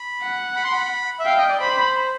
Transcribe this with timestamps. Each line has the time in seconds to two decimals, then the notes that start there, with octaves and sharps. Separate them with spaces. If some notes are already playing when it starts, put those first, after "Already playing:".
Already playing: B5
0.21 F#5
0.55 B5
0.64 C6
0.73 B5
1.19 E5
1.25 F5 G5
1.38 D#5
1.49 D5
1.60 C5 B5